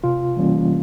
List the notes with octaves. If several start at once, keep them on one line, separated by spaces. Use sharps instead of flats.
C3 F4
E3 G3 A#3 C#4